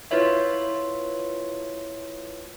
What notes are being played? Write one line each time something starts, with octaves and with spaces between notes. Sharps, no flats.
E4 F4 B4 C#5 E5